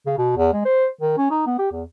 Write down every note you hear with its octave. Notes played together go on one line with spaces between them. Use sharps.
C#3
B2
E2
G#3
C5
D#3
C#4
D#4
B3
G4
E2